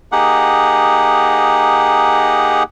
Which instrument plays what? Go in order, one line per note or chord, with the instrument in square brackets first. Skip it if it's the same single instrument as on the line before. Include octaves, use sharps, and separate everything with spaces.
[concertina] A#3 D#4 G4 G#4 F#5